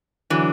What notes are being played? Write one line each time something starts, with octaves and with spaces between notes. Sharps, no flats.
D3 E3 F#3